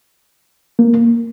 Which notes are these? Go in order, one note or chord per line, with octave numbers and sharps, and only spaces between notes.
A#3